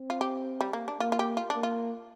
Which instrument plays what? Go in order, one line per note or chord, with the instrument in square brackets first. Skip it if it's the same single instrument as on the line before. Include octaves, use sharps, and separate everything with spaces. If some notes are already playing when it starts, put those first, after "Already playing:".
Already playing: [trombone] C4
[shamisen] F4
G4
G3
A#3
D4
[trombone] A#3 [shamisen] F4
[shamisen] F4
G4
F4
[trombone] A#3 [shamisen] D4
[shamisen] F4